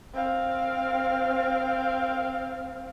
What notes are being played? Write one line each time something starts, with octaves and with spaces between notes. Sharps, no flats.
C4 F5